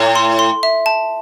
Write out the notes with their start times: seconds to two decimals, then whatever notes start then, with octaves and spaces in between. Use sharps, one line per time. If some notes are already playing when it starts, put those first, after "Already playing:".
Already playing: A2
0.16 C6
0.39 C6
0.63 E5
0.86 A5